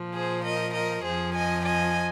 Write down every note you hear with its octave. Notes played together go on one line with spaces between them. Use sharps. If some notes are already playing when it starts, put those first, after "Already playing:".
Already playing: A#2 F3
G#4 C5
A#4 D#5
A#4 D#5
F2 F3 G#4 C5
D#5 G#5
D#5 G#5